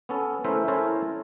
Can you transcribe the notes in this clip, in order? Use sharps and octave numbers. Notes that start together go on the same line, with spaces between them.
B3 C#4 A4
A3 C#4 E4 A#4 C5 E5
C#4 E4 A4 A#4 C5 C#5